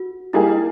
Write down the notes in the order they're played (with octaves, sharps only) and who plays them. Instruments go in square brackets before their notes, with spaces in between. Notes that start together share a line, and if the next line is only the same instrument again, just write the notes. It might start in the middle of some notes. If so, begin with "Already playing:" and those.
Already playing: [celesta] F#4
[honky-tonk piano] G3 A#3 D#4 G#4 [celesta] E4